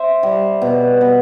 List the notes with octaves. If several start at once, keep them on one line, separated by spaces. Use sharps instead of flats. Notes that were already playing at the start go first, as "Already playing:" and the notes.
Already playing: C5 E5
G3
B2
B2